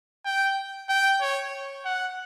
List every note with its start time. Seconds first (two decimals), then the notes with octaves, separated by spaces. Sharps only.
0.25 G5
0.89 G5
1.21 C#5
1.85 F#5